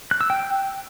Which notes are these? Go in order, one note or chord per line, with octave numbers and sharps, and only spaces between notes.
F#6
E6
G5